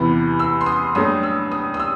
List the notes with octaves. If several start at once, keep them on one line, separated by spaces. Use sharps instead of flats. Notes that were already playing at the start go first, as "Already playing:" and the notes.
Already playing: E2 C3 E3 B3
E6
C6
D#6
G2 F#3 A3 D#6
E6
D#6
D#6
E6